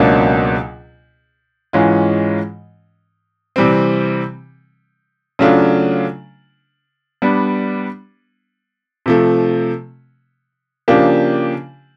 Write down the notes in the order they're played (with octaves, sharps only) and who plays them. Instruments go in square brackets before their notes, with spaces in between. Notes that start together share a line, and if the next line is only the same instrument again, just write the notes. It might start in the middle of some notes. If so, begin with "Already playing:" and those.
Already playing: [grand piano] C#2 B2 F#3 A#3 D4
G#2 E3 G#3 C#4 F4
C3 E3 G3 C4
C#3 F#3 A3 D4 F4
G3 B3 D4
C3 F3 A3
C#3 F3 A#3 D4 G4